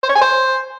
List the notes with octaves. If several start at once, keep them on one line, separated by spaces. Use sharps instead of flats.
C5
C#5
G#5
C5